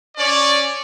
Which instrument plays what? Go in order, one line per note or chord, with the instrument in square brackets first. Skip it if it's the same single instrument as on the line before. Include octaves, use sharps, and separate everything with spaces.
[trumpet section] C#4 C#5 D5